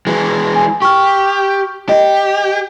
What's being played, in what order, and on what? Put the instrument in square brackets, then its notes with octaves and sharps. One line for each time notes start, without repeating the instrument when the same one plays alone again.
[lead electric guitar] E3 G#3
[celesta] G#5
[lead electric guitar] G4 [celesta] C#6 F6
[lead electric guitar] G4 [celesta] D#5